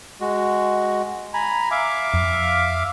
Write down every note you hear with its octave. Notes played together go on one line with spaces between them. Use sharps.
G#3 F#4
G#5 A#5 B5
E5 F5 D6
F2